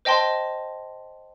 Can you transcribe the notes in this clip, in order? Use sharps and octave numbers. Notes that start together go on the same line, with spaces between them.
C5 D#5 G5 A5 C6